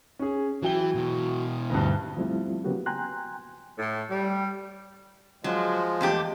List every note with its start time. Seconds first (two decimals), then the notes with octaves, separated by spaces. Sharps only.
0.19 C#4 G#4
0.62 E3 F#3 G5 G7
0.95 B2 E3
1.70 D2 G2
2.17 F3 G3 A3 C4 E4 F4
2.64 C#3 F#3 A#3 B3 F#4 G4
2.86 G5 G#5 A#5 C6 F#6
3.78 A2
4.10 G3
5.44 F3 F#3 G#3
6.01 E2 A3 G4